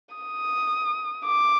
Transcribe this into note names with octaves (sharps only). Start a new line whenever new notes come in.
D#6
D6